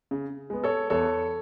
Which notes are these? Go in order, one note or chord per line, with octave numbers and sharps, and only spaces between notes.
C#3
G#3 B3
A4 C#5
E2 A4 C#5